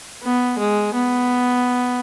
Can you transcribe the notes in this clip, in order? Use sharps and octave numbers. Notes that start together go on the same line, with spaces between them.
B3
G#3
B3